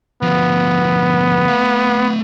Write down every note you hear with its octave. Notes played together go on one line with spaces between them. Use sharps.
D2 F3 B3
A3 F5